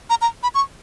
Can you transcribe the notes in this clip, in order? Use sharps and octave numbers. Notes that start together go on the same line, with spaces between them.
A#5
A#5
B5
C#6